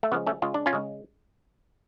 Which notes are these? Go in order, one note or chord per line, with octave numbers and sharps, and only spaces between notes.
A3
C#3 F3 G#3 B3
A3 C#4
C#3 G#3 F4
D4
C#4 F4
C#3 G#3